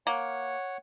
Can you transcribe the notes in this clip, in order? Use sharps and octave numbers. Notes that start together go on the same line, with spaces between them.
A#3 C#5 F#5